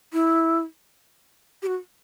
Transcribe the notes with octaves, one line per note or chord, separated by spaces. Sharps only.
E4
G4
F#4